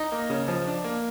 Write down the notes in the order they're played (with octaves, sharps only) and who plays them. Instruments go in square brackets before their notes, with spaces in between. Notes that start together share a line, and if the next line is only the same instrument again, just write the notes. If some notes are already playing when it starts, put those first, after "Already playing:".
Already playing: [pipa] D#4
[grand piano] A#3
C#3
F3
D4
A#3